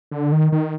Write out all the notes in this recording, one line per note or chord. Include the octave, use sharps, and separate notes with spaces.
D3
D#3
D#3